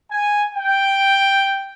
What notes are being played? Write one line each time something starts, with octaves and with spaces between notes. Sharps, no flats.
G#5
G5